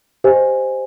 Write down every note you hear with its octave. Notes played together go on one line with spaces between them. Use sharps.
G4 C5 D#5 G#5